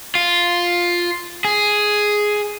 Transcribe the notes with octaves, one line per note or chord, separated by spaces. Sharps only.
F4
G#4